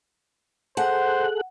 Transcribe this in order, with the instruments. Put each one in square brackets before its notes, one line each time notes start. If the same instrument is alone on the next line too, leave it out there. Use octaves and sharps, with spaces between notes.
[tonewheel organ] G#4 A4 F#6 [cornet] C5 [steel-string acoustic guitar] F#5